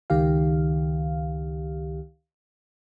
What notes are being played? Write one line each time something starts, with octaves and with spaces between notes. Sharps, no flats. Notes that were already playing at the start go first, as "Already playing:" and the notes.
C#2 D#3 G4 F5